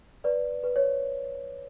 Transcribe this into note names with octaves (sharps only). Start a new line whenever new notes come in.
B4 D5
B4
C#5